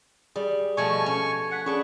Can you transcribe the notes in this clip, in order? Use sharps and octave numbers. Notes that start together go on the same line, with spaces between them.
G3 G#4 D5
B2 F3 A3 G#5 C#6
C#4
F#5 B6 C#7
C#4 D4 G#4 B4 C#6